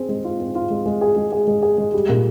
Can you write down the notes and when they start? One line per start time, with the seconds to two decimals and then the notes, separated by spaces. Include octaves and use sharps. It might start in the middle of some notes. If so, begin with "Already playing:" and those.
Already playing: C4 G#4
0.09 G#3
0.24 F4
0.40 C4
0.55 F4
0.70 G#3
0.86 G#3
1.01 G#4
1.16 G#3
1.32 G#4
1.47 G#3
1.62 G#4
1.78 G#3
1.94 G3
2.09 A#2